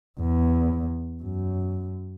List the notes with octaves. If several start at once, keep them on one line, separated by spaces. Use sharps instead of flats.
E2
F#2